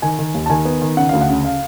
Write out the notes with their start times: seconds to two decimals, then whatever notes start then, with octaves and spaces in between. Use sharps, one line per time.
0.02 D#3 G#5
0.19 D#3
0.34 D#2
0.46 A5
0.50 D#3 G#5
0.65 B3
0.82 D#3
0.97 C#3 F#5
1.09 D2 F5
1.21 F#5
1.29 C#3
1.45 F5